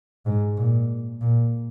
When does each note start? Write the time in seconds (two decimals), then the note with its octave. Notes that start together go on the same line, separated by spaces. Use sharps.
0.26 G#2
0.58 A#2
1.21 A#2